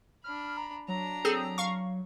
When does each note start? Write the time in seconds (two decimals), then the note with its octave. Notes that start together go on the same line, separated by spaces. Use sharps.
0.24 D4 B5 F6
0.57 A#5
0.88 F#3 D4 A#5
1.25 C4 G#4 A4
1.58 F5 C#6